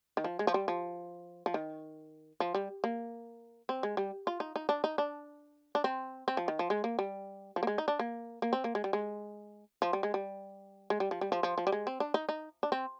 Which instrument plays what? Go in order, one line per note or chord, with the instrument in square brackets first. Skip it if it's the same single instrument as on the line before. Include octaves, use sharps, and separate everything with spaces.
[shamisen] D#3
F3
G#3
F3
G3
F3
F3
D#3
F3
G3
A#3
C4
G#3
G3
F4
D#4
D#4
D4
D#4
D4
D4
C4
C4
F3
D#3
F3
G#3
A#3
G3
F3
A#3
G#3
D#4
D4
A#3
A#3
C4
A#3
G#3
G3
G#3
F3
G3
G#3
G3
G#3
G3
F3
G3
F3
F3
F3
G3
G#3
C4
D4
D#4
D#4
D4
C4